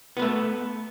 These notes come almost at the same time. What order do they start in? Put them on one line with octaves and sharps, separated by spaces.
B3 B4 A3